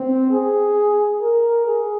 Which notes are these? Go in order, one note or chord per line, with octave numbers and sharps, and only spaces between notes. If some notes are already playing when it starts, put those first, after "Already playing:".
Already playing: C4
G#4
A#4
G#4